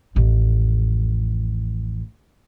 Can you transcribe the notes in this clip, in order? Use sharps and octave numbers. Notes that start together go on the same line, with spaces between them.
A1 F2